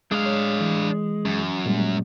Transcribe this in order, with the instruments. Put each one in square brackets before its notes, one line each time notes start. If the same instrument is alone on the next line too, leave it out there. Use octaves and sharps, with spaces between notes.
[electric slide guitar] G#3 [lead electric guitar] D4 F5
[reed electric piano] C#5
E3
[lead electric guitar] F#2
[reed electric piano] A#2 G3 G#3